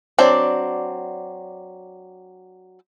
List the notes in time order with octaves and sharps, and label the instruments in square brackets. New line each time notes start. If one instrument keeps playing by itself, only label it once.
[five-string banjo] F#3 C4 D4 D5